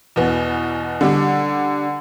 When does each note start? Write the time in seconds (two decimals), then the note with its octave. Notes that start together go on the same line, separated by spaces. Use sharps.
0.16 E2 B2 B3
1.01 D3 G3 D4